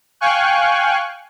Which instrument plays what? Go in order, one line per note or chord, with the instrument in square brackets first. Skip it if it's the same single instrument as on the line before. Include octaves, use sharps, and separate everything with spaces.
[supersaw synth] F5 G5 G#5 C#6 F#6